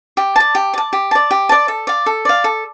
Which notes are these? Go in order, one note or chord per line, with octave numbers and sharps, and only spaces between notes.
G4
D5 A5
G4
D5 A5
G4
D5 A5
G4
D5 A5
A4
D5 F5
A4
D5 F5
A4